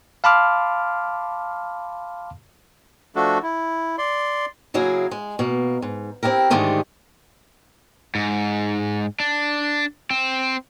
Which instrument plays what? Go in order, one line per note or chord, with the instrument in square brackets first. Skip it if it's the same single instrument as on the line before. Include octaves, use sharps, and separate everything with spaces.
[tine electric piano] F5 A5 B5 C6 D6 F6
[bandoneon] F3 A3 D4 F#4 A4
E4
D5 C6
[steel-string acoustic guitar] C#3 F#3 A#3 E4 G#4
G#3
B2 A#3
G#2
C4 D4 E4 G4 A#4
G#2 D3 D#3 G#3 A3 G4
[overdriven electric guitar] G#2
D4
C4